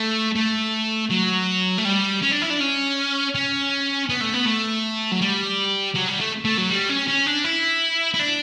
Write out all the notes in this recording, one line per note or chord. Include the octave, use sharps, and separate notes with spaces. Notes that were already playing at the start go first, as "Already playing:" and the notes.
Already playing: A3
A3
F#3
A3
G3
C#4
D4
E4
D4
C#4
C#4
B3
A3
B3
A3
F#3
G3
F#3
G3
A3
A3
F#3
G3
C#4
C#4
D4
E4
E4
D4